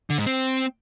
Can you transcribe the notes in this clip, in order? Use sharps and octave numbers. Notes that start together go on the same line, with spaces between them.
D3
G#2
C4